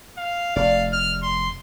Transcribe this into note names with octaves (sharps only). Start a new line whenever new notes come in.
F5
F1 D5 F5
F6
C6